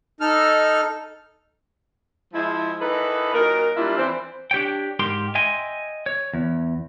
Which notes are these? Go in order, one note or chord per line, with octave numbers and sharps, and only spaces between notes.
D#4 A4 F6
F3 G#3 E4
D#3 E3 D#4 A4 B4
A#2 F#3 D#4 A#4
F#3 G3 A#3 D4 E4 F4
E3 C4
D4 G4 C#5 G5
G#2 G4 A#4 G5 C6
D#5 E5 G5 G#5 C6
C#5
E2